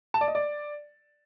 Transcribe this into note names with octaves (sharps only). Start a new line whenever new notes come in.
A5
D5
D#5
D5